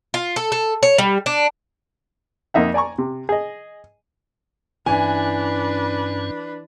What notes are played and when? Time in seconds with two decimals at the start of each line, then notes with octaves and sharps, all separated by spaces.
0.14 F4
0.36 A4
0.52 A4
0.83 C#5
0.98 G3
1.26 D4
2.54 F2 A#3 D#4 E5 F#5
2.74 D5 G#5 A#5 C#6
2.98 C3
3.29 G#4 D#5
4.86 G2 E3 C#4 D4 B4 G#5